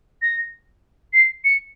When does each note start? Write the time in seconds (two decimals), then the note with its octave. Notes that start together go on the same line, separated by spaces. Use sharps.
0.22 A#6
1.13 C7
1.45 C#7